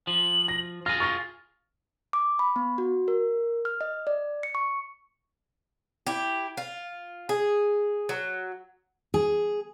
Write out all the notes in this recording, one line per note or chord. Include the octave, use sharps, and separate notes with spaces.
F3 F#7
A#6
F4 G#4 F6 A#6
C#6 F6 A6 A#6
D6
B5
B3
F#4
A#4
F6
D#5
D5
C#7
C#6
E4 G4
F4
G#4
F#3
G#4